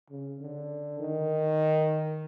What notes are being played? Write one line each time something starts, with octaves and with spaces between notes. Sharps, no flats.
C#3
D3
D#3